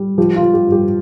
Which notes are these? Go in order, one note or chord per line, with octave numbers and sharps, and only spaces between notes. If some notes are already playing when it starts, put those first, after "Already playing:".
Already playing: G3
F3 G4
F4
F3
G4
G2
G4